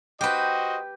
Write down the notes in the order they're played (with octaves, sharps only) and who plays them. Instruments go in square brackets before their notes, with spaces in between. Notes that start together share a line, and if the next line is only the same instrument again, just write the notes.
[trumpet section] F#4 C5 D#5 [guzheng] G4 B4